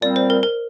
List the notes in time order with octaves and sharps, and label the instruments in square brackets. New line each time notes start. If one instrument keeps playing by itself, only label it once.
[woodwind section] A#2 G3 C4 [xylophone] D5
[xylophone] C5
A#4
A#4